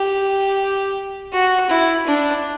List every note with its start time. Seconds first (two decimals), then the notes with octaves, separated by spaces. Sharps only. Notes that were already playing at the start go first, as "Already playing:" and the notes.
Already playing: G4
1.33 F#4
1.70 E4
2.06 D4